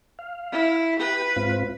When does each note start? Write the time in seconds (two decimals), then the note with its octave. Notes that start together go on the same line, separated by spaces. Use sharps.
0.19 F5
0.52 E4
1.00 G4 B4
1.36 G#2 C4 F4